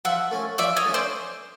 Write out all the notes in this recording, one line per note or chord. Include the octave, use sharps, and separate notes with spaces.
F3 E5 F#5
A3 C#4
F3 D5 E5
C#5 D#5
A3 C#4
C5 D5